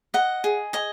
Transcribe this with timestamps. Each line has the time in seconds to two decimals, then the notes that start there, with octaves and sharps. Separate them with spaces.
0.14 D#5 F#5
0.44 G#4
0.73 D#5 G#5